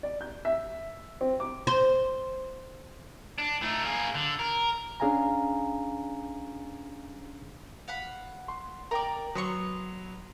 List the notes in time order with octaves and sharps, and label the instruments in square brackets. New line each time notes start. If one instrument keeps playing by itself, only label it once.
[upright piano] D5
G6
E5
C4
D6
[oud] C5
[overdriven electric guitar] D4
A3 D#4
A#3 G#4
D3
A#4
[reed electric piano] C#4 D4 G#4 F5 G#5 A#5
[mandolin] F5 F#5 B5
[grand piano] C6
[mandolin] A#4 D5 [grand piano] G5 A#5
[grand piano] F#3 [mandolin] B3 C6 C#6